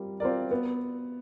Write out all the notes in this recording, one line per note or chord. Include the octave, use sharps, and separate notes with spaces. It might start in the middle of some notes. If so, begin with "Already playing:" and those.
Already playing: G3 C4 F4 A#4
C4 F4 A#4 D5
B3